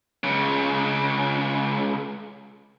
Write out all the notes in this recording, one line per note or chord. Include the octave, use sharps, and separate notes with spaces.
C#2 C#3